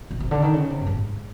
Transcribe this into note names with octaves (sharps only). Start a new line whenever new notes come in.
B2
C3
D3
D#3
C#3
C3
G2
G#2